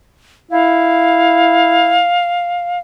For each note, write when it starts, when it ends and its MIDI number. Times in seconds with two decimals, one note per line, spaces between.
0.51 2.05 64
0.51 2.79 77